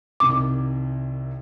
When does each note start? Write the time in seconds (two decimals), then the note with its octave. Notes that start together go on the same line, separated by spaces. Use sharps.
0.20 C2 C3 D#3 D6